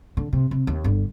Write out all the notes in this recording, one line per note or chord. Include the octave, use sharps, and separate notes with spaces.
D3
C3
C3
D#2
G1 D3